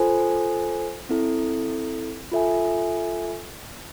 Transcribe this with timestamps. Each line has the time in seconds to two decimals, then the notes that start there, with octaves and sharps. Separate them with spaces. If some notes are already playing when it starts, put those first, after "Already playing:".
Already playing: F4 A4 C5 G#5
1.09 C4 E4 A4
2.32 F4 A4 E5 G#5